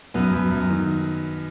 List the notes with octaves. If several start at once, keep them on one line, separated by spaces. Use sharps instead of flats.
F#2 B3 B4
F#2
F#2
D#3